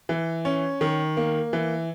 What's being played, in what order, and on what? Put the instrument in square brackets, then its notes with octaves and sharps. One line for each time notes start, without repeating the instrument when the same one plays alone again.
[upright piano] E3
C#4
D#3
A#3
E3